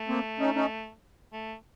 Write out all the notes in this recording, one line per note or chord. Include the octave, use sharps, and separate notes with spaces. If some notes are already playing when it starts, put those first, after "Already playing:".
Already playing: A3
A#3 C4
C#4 D#4
C#4 D#4
A3